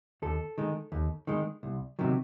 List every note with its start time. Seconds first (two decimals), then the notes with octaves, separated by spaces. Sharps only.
0.22 D#2 A4
0.58 D#3 G#3
0.92 D#2
1.27 D#3 G#3
1.63 C2
1.99 C3 D#3 F#3